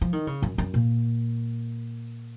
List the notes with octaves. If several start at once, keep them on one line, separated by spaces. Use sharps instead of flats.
F3
D#3
C#3
F#2
F#2
A#2